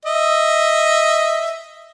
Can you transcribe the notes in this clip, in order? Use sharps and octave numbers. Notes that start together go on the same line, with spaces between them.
D#5 E5